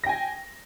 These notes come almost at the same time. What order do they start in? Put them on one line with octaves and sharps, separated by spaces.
A#6 G5 G#5